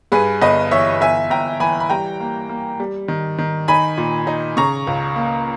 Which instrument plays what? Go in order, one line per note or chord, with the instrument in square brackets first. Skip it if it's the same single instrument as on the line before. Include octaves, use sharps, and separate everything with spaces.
[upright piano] G2 G#4 B4
G1 B4 D#5
E3 C#5 E5
G1 E5 G#5
G1 G5 A#5
E3 G#5 B5
B5
G3 G5 A#5
A#3
A#3
G3
D#3
D#3
D#4 G#5 B5
A#2
D#4
C#3 A#5 C#6
C#2
A#3